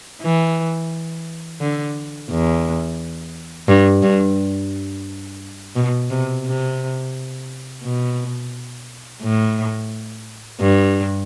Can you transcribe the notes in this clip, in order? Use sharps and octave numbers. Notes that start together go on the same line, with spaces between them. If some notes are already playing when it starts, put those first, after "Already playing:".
E3
D3
E2
G2
G2
B2
C3
C3
B2
A2
G2